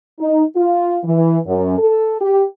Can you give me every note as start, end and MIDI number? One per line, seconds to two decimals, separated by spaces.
0.19 0.43 63
0.56 0.98 65
1.04 1.38 52
1.47 1.77 42
1.78 2.20 69
2.20 2.44 67